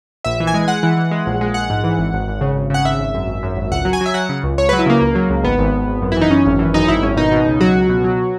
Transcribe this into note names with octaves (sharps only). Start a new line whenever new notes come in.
A#1 E5
E3
G#5
G#3
G#3 F#5
E3
E3
G#3
A#1
G#3
A#1 F#5
G#2
E3
G#1
G#1
G#1
C#3
G#1
C#3 F#5
G#1 E5
G#1
F#2
G#1
F#2
G#1
C#2 F#5
F#3
G#5
F#3
E5
F#3 F#5
C#3
C#2
C#2 C#5
F#3 B4
E4
C#3 A#3
C#2
F#3
C#2
G#1 B3
G#1
G#1
G#1
F#2
E4
E3 D#4
F#2 C#4
G#1
E3
F#2 D#4
G#1 E4
G#1 C#4
B2 D#4
B2
C#2
F#3 F#4
C#2
B2
F#3